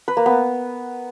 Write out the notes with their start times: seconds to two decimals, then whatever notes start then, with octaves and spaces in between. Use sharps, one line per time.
0.08 B4
0.17 A#3
0.26 B3